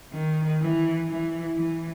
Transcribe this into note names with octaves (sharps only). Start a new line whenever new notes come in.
D#3
E3
E3
E3